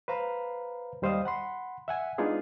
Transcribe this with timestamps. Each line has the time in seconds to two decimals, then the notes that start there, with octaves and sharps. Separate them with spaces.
0.08 B4 C5 F5 A#5 B5
1.02 D#2 G3 C5 D#5 F5 D#6
1.25 F#5 B5 C6
1.88 E5 F#5 G#5
2.18 G#3 B3 D4 D#4 F4 G#4